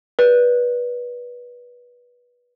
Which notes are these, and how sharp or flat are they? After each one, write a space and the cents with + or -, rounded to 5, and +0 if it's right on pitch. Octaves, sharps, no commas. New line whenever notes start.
B4 -20 D5 -5